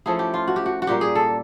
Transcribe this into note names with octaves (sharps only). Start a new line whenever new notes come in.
F3 A3 C#4 E4 G#4
G4
F4
F#4
G4
F#4
F#4
A#2 G3 A#3 G4
G#4
A4